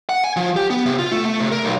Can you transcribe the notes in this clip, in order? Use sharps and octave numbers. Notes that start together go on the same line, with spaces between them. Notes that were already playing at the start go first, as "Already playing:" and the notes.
F#5
G#5
F3
G4
B3
C3
F4
A3
A3
C3
A#4
B1